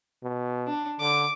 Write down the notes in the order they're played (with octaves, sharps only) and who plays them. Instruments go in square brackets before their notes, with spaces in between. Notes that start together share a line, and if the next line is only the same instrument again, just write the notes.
[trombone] B2
[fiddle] D4
[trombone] D3 [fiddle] D6